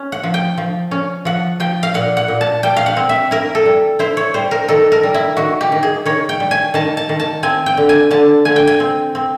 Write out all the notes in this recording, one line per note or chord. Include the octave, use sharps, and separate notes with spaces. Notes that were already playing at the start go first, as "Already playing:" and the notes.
Already playing: C#4
F#5
F3
G5
F3
C#4
F3 F#5
F3 G5
F5
A#2 F#5
F#5
A#2
A5
G3 G5
F5
F#5
C4
E5
E4 A#4
A4
G3
E4 C5
C#5
G3 C5
A#4
D#3 A4
A#4
G3
E4
D#3 F#4
G4
D#3
G#4
D#3 C#5
G5
G3
G#5
D#3 A5
A5
D#3
A5
C4 G#5
G5
D3
G#5
D3 A5
D3 G#5
G5
G#5
C4
C4